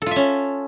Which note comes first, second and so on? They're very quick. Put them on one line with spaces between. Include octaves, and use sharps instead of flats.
A4 F4 E5 C#4